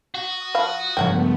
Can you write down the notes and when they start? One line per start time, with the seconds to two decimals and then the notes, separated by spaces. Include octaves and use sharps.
0.15 F#4 D#6
0.55 F3 F5 B5
0.97 C#2 G2 F3 A3 B3 C#5 F#5 G5